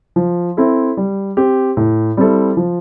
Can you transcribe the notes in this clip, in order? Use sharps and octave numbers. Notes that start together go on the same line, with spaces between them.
F3
C4 E4 A4
G3
C4 G4
A2
G3 C4 E4 A4
F3